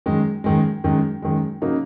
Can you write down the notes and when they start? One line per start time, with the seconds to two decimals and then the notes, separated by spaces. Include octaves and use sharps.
0.06 F#2 D#3 G#3
0.44 F#2 D#3 G#3
0.84 F#2 D#3 G#3
1.22 F#2 D#3 G#3
1.62 C#3 F#3 A#3 D#4